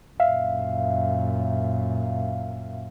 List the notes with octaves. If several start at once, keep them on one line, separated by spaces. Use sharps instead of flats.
F#2 A#2 E5 F5